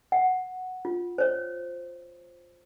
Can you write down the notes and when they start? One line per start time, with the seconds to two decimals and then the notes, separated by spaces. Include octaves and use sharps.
0.12 F#5
0.85 F4
1.18 C5 C#5